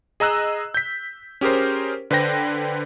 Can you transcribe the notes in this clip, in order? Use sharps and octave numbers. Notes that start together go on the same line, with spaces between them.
G#4 D#5 A#5 E6 F#6
G6 B6
C#4 G4 G#4 A#4 C5
D3 B4 C5 G5 A#6